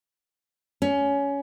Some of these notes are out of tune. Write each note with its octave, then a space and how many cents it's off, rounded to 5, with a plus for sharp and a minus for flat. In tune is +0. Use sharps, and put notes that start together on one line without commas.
C#4 +20